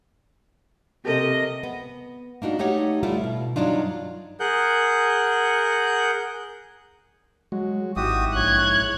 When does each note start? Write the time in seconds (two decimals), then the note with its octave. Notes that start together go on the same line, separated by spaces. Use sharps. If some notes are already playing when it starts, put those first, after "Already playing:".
1.05 C3 G4 A4 A#4 D#5
1.63 B3
2.42 A#3 D4 D#4 F#4
2.59 A3 D#4 G4 C#5 F#5
3.03 G3 A3 E4 F4
3.24 B2
3.56 G2 F#3 D4 D#4 F4
4.40 G#4 A#4 F#5 F#6 G6
7.52 F#3 G#3 F#4
7.96 G#1 G#2 E4 F#4 G4 D#6
8.35 A#1 C#5 F#6 G#6